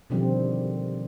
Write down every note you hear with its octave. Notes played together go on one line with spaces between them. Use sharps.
B2 D3 D#3 F3 G3 C4